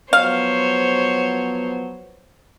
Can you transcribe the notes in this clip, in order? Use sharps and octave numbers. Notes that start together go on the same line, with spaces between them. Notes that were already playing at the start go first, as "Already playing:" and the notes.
F3 F#3 B3 C5 C#5 F5